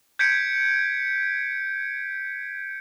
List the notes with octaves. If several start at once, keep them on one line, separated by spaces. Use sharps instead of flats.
G6 G#6 B6 C#7 D7